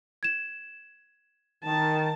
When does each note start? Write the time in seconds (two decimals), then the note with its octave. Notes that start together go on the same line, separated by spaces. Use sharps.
0.23 G#6 E7
1.65 D#3 A5